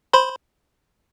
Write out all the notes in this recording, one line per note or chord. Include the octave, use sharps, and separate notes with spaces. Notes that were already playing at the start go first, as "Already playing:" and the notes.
C5 B5 C6